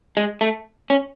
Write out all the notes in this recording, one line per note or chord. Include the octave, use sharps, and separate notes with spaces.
G#3
A3
C#4